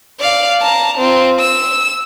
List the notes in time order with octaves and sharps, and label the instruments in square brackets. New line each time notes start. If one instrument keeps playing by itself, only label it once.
[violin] D5 F5
A5 A#5
C4 F4
E6